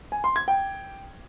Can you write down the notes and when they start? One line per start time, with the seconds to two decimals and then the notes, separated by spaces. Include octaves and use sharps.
0.12 G#5
0.24 C6
0.36 G#6
0.48 G5